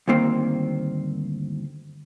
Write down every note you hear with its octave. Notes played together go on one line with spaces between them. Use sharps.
D2 G2 D#3 A#3 C4